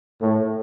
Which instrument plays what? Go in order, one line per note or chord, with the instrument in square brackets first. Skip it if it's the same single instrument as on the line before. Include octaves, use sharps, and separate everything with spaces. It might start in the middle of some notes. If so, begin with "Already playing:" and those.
[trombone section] A2